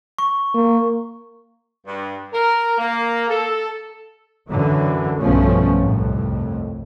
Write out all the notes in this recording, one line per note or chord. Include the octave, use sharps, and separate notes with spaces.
C#6
A#3
G2
A#4
A#3
A4
F#2 D3 E3 F#3
B1 G2 B2 F3 A3 C#4
C2 F2 A2